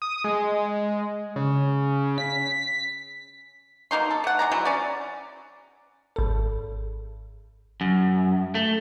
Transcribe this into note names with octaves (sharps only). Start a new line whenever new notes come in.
D#6
G#3
C#3
B6
B2 A#3 D#4 C6
A4
A3 F#5
G#3 D5 A#5
F#3 G#3 E4
C#4 D5
G#1 A4
F#2
A3